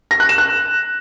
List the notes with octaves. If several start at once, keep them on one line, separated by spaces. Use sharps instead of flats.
A#6
F#6
E7
F#6